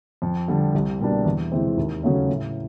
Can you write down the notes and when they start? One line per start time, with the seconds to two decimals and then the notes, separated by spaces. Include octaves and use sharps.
0.22 F2
0.48 D3 G3
0.74 C2
1.00 B2 G3 A#3 D4
1.25 E2
1.52 C3 E3 G#3 C4
1.77 D#2
2.03 C#3 F#3 A3 C#4
2.29 A2